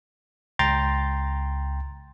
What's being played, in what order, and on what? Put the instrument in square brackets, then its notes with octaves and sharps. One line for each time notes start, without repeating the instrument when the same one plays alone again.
[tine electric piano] C#2 G5 A#5 C6 A6